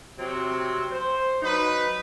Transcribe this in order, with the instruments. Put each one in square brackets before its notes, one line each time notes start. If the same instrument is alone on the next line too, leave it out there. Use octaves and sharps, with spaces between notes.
[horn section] C3 F#3 C4
C5
F#3 D#4 B4